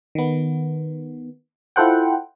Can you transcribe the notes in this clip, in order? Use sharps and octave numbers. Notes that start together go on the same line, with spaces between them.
D#3 B3
E4 F4 A4 C5 F#5 G5